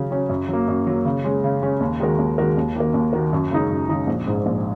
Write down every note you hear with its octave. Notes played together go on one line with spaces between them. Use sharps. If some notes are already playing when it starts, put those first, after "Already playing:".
Already playing: C#3 F#3 C#4
F#3 C#4
F#2
F#3 A#3
F#2
F#3 A#3
C#3
G#3 C#4
C#3
G#3 C#4
D#2
D#3 G#3 F#4 A#4
D#2
D#3 G#3 F#4 A#4
D#2
D#3 A#3 F#4 A#4
D#2
D#3 A#3 F#4 A#4
F#2
C#3 G#3 D#4
F#2
C#3 G#3 D#4
A#1
G#2 G#3 D#4
A#1